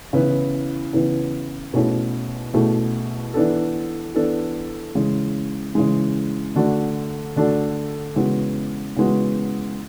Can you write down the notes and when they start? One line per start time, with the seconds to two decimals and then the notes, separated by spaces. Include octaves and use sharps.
0.13 C#3 E3 B3 E4 B4
0.93 C#3 E3 B3 E4 B4
1.74 B2 A3 C#4 E4 G#4
2.54 B2 A3 C#4 E4 G#4
3.34 E3 B3 D4 A4
4.15 E3 B3 D4 A4
4.95 C#3 E3 G#3
5.75 C#3 E3 G#3
6.55 D3 A3 D4 F#4 A4
7.36 D3 A3 D4 F#4 A4
8.16 C#3 E3 G#3 B3 F#4
8.96 C#3 E3 G#3 B3 F#4